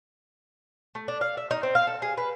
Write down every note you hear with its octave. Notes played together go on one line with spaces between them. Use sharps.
A3
D4
F5
E5
D#4
C4
F5
A4
G#4
B4